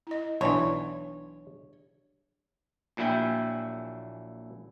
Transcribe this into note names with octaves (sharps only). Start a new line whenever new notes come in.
E4 D#5
B1 E3 D4 C#5 D5 C6
A#1 A#2 F#3 E4 E5 G5